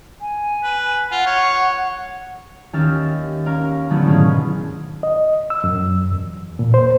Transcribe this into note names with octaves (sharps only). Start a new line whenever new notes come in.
G#5
B4
F4 F#5
C#5
D#2 C#4 G4 E5 F6 A6
C#4 A#4 F5
D3 F#3 A3 B3 C#4 E4
G#2 B2 D#3 C#4 G#4 F5
D#5
E6
F#2
E2
A#2
C5